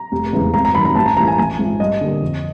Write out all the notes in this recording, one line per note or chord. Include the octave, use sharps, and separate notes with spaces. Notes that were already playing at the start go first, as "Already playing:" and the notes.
Already playing: A#5
F1
E2 C#3 E3 G#3
G#1 A#5
A#5
F#2 D#3 B5
A#5
A1 A5
A#5
A2 E3 G3 A#5
G#5
A1 G#5
G#2 F3
G2 D#5
D3 G3 A#3
F2